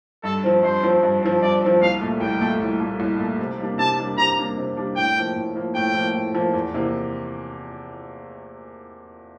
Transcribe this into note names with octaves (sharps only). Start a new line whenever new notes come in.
G2 A4
F3 C4
G2 C5
F3 C4
G2
F3 C4
G2 D5
C4
F3
C2 F5
A#2 A3
C2 G5
A#2 A3
C2
A#2 A3
C2
A#2 A3
C3
G3 A#3 D4
C3 A5
G3 A#3 D4
C3 A#5
G3 A#3 D4
C3
G3 A#3 D4
A2 G5
F3 A#3
A2
F3 A#3
A2 G5
F3 A#3
A2
F3 A#3
E2
C3 E3 A#3